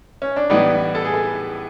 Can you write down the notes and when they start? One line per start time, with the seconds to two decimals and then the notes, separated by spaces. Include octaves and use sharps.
0.22 C#4
0.36 D4
0.50 A2 E3 G3 B3 D#4
0.95 A4
1.05 G#4
1.14 A4